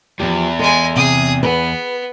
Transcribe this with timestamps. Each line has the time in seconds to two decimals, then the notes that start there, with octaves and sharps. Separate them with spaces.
0.20 E2 F3 G4
0.59 G#3 A4 G#5
0.96 C3 G#4 D#6
1.43 B3 G#4 B4